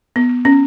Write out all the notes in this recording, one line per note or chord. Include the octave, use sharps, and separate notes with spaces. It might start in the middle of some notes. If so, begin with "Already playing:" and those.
B3
C#4